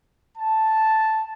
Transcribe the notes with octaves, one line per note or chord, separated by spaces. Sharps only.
A5